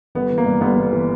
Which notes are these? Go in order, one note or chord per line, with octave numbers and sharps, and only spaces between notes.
G1 B3
E3
A#3
G2
G1 B3
G1
E3